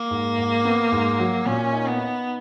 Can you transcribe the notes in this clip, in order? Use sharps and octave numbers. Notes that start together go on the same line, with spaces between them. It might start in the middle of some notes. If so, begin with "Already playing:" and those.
Already playing: A#3
G#2
G#2
B3
G#2
F#3
A#2 C#4
D#4
B3
D#4